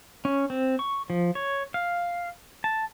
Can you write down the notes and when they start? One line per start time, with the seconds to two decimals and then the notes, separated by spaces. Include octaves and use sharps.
0.25 C#4
0.50 C4
0.79 C#6
1.10 F3
1.35 C#5
1.74 F5
2.64 A5